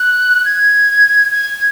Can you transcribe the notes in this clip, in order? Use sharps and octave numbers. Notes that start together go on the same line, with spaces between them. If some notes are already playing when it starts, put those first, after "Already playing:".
Already playing: F#6
G#6
G#6